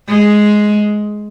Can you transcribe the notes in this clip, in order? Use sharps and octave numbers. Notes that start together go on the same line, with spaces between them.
G#3